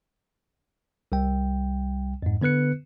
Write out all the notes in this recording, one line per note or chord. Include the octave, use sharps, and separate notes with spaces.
C2 G3 G5
F2 G#2
D3 B3 B4 F#6 C#7